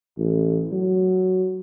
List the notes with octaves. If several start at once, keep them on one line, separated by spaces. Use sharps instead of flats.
A1
F#3